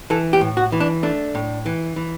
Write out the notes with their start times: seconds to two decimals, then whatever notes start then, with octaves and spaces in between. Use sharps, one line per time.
0.10 E3 A4
0.33 G4
0.41 A2
0.57 F#4
0.72 E3
0.80 D4
1.03 A3 D4
1.35 A2
1.66 E3
1.96 E3